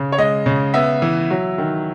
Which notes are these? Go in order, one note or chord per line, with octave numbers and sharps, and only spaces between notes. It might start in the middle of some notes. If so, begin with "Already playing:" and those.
Already playing: C#3
C#5
G#3 D#5
C#3
B3 E5
E3
F#3
D#3